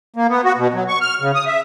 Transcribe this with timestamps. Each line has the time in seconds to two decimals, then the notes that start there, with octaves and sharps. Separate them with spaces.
0.16 A#3
0.29 B3
0.44 F#4
0.57 B2
0.74 F#3
0.88 C#6
1.01 F6
1.21 C#3
1.35 D#6
1.46 E5